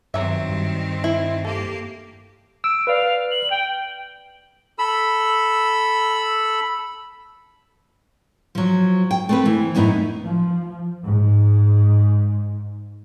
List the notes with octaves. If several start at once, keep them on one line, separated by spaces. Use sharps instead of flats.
G2 D#3 F#3 C4 E5
G2
E4
A#3 G4 A4
E6 D7
B4 D5 F5
F#7
G5
A4 B5 E6
F3 F#3
G5
A3 C4 B4
E3
F#2 A2 B3 D#4 E4
F3
G#2